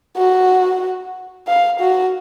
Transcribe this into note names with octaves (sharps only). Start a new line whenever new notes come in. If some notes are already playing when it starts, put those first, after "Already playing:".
F#4
F5
F#4